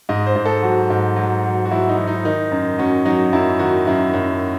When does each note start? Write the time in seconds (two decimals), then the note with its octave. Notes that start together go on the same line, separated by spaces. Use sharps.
0.09 G#2 D#5
0.26 C5
0.36 G#2
0.45 A4
0.62 F#3 F#4
0.90 G#2
1.16 F#3
1.43 F#3
1.65 F#4
1.71 F#3 E4
1.89 D#4
1.97 F#3
2.07 D#4
2.25 D#3 D#4
2.52 F#2
2.78 F#3 C#4
3.05 F#3 D#4
3.33 F#2 E4
3.59 D#3 F#4
3.87 F#2 E4
4.13 F#2